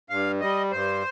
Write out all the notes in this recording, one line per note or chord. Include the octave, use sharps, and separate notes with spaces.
G2 F5
G3 D#5
G2 C5